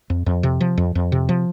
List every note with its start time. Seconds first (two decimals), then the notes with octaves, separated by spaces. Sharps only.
0.10 F2
0.26 F2
0.43 C3
0.61 F3
0.78 F2
0.95 F2
1.12 C3
1.29 F3